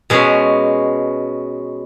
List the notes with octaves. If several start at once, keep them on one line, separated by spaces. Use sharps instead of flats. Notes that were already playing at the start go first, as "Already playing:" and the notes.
B2 G#3 C#4